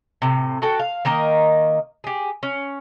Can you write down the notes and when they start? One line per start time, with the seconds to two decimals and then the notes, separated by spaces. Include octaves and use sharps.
0.22 A2 C3
0.62 F#4 A4 G5
0.80 F5
1.05 D#3 A#3 A#4 D#5
2.04 G4 G#4
2.43 C#4